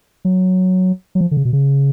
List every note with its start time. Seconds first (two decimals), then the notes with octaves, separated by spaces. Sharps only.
0.25 F#3
1.15 F#3
1.21 F3
1.31 D3
1.37 C#3
1.45 B2
1.53 C#3